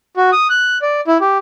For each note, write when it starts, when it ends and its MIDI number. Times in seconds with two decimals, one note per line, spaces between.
0.17 0.30 66
0.32 0.47 87
0.50 0.78 90
0.82 1.00 74
1.07 1.18 64
1.21 1.38 67